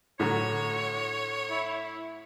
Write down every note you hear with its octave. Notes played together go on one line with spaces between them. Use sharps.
A2 D3 F#3 C#5
E4